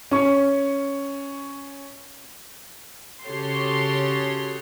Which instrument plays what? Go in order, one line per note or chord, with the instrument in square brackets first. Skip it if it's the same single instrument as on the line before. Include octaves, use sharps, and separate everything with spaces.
[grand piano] C#4 C#6
[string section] C#3 F#4 G4 A4 C#5 C6